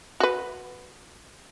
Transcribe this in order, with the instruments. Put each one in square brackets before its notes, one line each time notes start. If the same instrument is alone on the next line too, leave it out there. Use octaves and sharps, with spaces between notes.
[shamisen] F#4 B4